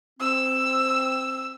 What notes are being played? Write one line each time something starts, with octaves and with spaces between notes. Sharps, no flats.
C4 E6